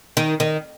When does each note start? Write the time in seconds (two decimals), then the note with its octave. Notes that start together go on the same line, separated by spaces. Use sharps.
0.17 D#3
0.40 D#3